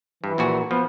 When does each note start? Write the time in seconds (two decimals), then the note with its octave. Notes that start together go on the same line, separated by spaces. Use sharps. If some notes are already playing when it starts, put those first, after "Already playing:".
0.24 G2 E3
0.38 A#1 A#2 F#4
0.71 F3 B3